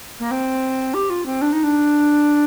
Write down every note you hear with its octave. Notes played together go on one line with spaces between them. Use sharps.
A#3
C4
G4
F4
C4
D4
D#4
D4